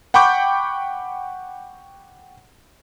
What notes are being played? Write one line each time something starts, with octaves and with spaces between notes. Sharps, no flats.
F#5 G5 B5 C#6 D6 G6